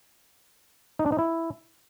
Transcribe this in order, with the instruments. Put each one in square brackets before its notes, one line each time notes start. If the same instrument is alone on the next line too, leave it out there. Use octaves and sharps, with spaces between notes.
[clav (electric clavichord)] D#4
D4
D#4
E4